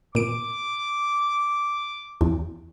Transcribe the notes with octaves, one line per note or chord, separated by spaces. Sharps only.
A#2 D6 D7
E2